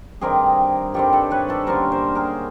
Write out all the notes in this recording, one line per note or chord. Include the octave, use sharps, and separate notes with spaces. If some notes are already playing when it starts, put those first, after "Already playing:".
G2 D#3 G3 C4 G#4 A#4
G2 D#3 G3 C4 G4 A4
A4 B4
B4 C#5
A4 B4
D3 G3 A#3 C#4 A#4 C5
A#4 C5
G#4 A#4